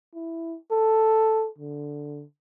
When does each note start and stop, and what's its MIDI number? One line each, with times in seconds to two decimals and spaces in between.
0.15 0.57 64
0.72 1.48 69
1.59 2.23 50